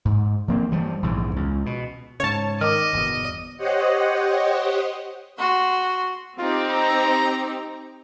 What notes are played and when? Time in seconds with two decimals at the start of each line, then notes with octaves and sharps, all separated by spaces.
0.05 G#2
0.48 F3 A#3 C4
0.71 G2 E3 F3 G3
1.03 A#1 E2 G#2
1.36 C#2
1.66 B2
2.20 G#2 C#3 C#5 A5
2.61 D#3 D#5 D6 F6
2.93 G1 E2 B2
3.57 G4 C5 C#5 D#5 F#5
5.38 F#4 C6
6.39 C4 D#4 F4 G4
6.70 A#5